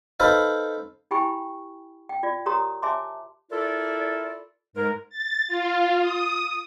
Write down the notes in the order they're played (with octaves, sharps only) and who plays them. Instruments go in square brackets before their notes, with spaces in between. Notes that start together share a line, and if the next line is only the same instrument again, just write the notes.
[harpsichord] D#4 A4 B4 C5 F5
[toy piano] E4 G4 G5 G#5 B5 C#6
G5
F4 D5
G4 A#4 C#5 A#5 C6 D#6
C#5 E5 G#5 A5 C6 D6
[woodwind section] E4 F4 A4 A#4 D5
G#2 G#3 A#4
[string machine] A6
F4
D#6